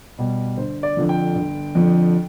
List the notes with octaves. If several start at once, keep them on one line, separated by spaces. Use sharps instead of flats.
B2 G3
G1 C5
D5
F2 D3 F3
G5
G1
F2 D3 F3